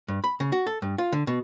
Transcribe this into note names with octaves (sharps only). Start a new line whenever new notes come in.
G2
B5
C#3
F#4
A4
G2
F4
D3
B2